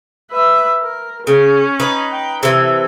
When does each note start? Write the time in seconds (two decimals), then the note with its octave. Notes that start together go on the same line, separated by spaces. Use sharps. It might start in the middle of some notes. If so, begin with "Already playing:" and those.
0.31 B4 E5
0.82 A#4
1.27 C#3 C#4
1.80 D#4 B4
2.11 G5
2.43 C3 E3 A4